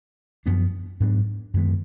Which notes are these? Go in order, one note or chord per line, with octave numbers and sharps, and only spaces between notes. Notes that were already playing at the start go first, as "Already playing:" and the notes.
F#2 F3 B3 D4
G#2 F#3 B3 D4
F#2 D#3 G#3 B3